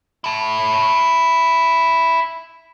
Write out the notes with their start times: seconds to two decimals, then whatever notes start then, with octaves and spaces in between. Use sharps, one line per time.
0.24 E4 A5